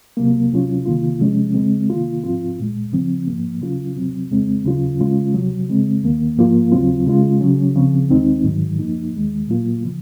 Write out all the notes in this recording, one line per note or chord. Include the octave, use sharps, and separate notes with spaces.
C2 C3 F#3 A#3
C#2 C3 F#3 C#4 F4
C2 C3 D#3 A#3 F4
C3 F3 G#3 C#4
C#2 C#3 G#3 C4
C3 D#3 A#3 F4
G#2 F3 C4 F4
C2 A#2 G#3
C#2 C#3 F3 C4
G#2 F3 A#3
C#3 F#3 C#4 F4
C#2 C3 F#3 C4
F2 C#3 G#3 C4
D#2 C#3 F#3 C#4 F4
C#3 G#3 C#4 F4
C#2 C3 F#3
C#3 G#3 C4
D#2 D#3 A#3
G#2 F3 A#3 F4
D#2 C#3 F#3 C4 F4
C#3 G#3 C#4 F4
C#3 F#3 C#4
C#2 C#3 F3 C4
D#2 D#3 G#3 C4 D#4
G#2 D#3 F#3
F#2 F3 A#3 D#4
D#2 D#3 G#3
A#2 F#3 A#3 F4
C#3 F3